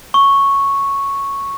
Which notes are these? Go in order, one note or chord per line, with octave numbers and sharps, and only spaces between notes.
C#6